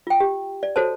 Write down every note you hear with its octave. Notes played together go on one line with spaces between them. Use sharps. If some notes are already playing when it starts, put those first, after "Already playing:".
F4 G5
G4
D5
F#4 A4 C5 C#5 A5